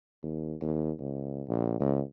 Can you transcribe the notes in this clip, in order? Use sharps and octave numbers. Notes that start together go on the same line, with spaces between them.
D#2
D#2
C#2
A#1
C#2